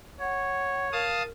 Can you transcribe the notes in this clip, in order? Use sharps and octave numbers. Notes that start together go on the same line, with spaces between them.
C#5 F#5
A#4 F5 A5 D#6